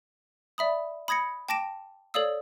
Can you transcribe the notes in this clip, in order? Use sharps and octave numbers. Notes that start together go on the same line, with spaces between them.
D5 E5 B5 D#6
B5 D#6 G#6 A#6 C#7
G5 A5 D6 A#6 D7 E7
A4 C#5 D5 F5 D#6 E6